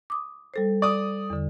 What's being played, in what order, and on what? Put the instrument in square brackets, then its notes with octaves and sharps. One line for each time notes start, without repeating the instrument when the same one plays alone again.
[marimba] D6 D#6
G3 A4 C5
[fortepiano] D5 D#6
[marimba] E2 D3